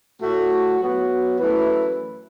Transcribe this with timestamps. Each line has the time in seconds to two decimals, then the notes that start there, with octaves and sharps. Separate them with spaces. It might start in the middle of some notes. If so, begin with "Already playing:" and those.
0.21 A2 A3 F#4
0.80 F#3 B3 F#4
1.40 F#2 E3 A3 E4 B4